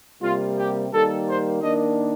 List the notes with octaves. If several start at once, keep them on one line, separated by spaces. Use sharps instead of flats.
C3 G3 A#3 F4
G4
D#3 G3 A#3 A4
C5
D#3 A#3 D4 D#5